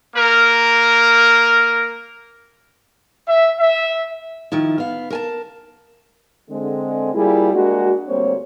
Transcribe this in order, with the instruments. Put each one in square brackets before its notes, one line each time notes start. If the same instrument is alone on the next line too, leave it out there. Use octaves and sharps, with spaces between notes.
[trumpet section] A#3 A#4
E5
E5
[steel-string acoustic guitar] D#3 F3 E4
B3 F5
A#4 G#5 A5
[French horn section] D3 G#3 C4
G3 A#3 E4 F4 G#4
G#3 A#3 D4 F#4
D2 G3 A#3 C4 C5 C#5